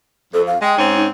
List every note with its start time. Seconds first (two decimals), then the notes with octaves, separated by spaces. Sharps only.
0.34 F2 A4
0.47 F5
0.62 G#3 G5
0.78 G#2 C4 C#4
0.95 D#4